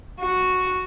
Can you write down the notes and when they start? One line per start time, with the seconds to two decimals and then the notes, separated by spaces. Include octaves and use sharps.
0.20 F#4